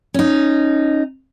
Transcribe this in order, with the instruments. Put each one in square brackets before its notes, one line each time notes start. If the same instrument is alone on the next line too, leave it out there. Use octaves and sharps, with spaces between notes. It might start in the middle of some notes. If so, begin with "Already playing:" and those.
[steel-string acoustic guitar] C#4 D#4